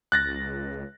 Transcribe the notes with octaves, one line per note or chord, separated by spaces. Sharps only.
C#2 F#6 A6 A#6